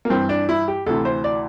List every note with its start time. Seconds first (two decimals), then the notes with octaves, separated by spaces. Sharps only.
0.05 A#3
0.10 G2 E3 C4
0.29 D4
0.49 E4
0.68 G4
0.86 D2 C3 E3 A4
1.05 C5
1.24 D5